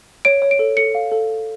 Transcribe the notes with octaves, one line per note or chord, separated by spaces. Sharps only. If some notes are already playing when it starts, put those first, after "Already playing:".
C#5 D7
C#5
D7
A4
A4 C#7
F5
A4
A4